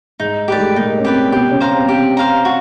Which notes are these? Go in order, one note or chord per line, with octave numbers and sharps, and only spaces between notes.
G#2 G#3 D#4
A3 G4 B4 D5
G#2 G#3
A#2 A#3 D#4
C#4
C3 C4 G4 B4 D5
B2 B3 G4
C#3 C#4
C5 F5 A#5
C4
B3
C3 C4 G4
C5 F5 A#5
F#4